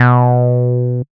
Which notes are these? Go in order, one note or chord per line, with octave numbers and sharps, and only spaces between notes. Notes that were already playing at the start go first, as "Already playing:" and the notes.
Already playing: B2